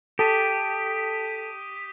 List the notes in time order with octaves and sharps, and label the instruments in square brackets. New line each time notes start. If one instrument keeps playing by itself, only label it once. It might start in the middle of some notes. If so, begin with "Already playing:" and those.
[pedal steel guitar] G4 [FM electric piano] A4 A5 [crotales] D#6 B6 D#7